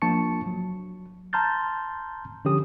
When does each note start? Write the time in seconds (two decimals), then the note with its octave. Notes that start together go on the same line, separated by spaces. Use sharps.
0.02 F3 A#3 D4 A5 C#6 C#7
0.47 F#3
1.33 A5 A#5 C6 F6 G6 A6
2.45 D3 F3 C#4 G4 D#6